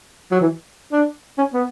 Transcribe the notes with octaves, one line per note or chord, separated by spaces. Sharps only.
F#3
E3
D4
C#4
B3